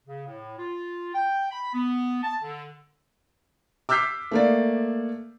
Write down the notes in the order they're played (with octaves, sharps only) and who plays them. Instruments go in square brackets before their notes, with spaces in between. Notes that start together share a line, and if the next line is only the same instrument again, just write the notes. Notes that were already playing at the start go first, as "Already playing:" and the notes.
[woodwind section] C#3
A2
F4
G5
B5
B3
A5
D3
[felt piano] D6 E6 F6 G6 B6 C7
A3 A#3 D5